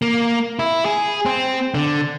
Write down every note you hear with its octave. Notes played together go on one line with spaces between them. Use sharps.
A#3
E4
G#4
C4
D3